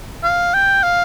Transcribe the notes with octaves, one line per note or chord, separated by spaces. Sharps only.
F5
G5
F5